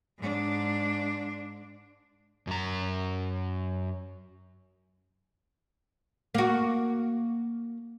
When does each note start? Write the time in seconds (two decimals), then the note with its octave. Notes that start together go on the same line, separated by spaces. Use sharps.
0.18 G#2 D4
2.47 F#2 A#5
6.35 A#3 F#4